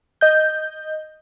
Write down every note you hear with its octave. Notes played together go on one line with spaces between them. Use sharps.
D#5 G6